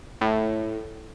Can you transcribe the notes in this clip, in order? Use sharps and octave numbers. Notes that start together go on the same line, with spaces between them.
A2